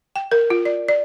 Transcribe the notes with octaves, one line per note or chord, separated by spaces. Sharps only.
G5
A#4
F4
D5
D5